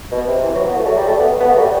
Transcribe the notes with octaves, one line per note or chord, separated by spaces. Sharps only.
B2
C3
E3
F#3
B3
A3
F#3
G3
A3
B3
B3
A3
F#3
G3